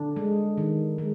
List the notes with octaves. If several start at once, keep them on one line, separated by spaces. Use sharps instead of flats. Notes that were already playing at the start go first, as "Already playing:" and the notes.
Already playing: D3 D4
G#3
D#3
G#3